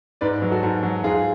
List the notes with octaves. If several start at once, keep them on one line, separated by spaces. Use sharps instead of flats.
G#2 B4 D5
F#3
F#4 A4
G#2
F#3
G#2 F4 G#4